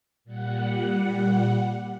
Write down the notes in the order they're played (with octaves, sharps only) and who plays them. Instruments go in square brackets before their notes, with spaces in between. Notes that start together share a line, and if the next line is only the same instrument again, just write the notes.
[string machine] A#2 G3 F#5